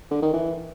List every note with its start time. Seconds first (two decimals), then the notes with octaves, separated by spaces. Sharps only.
0.11 D3
0.22 D#3
0.33 E3